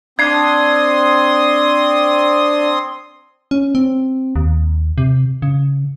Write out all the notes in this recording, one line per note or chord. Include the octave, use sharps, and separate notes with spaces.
C4 D4 C6 D#6 G#6 C7
C#4
C4
D#2
C3
C#3